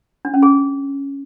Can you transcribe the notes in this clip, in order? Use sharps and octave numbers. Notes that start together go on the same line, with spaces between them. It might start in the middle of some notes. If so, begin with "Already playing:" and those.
D4
C#4
G#4